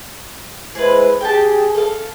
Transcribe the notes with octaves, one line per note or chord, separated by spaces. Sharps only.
G#3 E4 G#4 B4 C5
G4 G#4 G5 A5
A4 F5